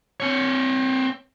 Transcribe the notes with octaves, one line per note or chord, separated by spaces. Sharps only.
C4 C#5